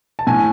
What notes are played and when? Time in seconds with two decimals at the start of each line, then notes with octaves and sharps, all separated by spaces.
0.19 A5
0.27 A2 G#5